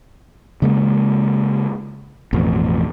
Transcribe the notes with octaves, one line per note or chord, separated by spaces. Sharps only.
C#3 G#3 A#3
A1 F2 B2